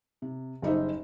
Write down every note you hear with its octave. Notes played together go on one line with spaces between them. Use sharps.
C3
F#1 G3 D#4 G4 C5 E5